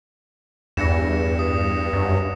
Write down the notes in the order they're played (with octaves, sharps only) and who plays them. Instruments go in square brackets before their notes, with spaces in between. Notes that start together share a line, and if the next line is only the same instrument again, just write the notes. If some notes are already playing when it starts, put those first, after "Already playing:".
[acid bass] E2 [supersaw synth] G2 [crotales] A#6 C#7 E7
[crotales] D#6
[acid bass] F#2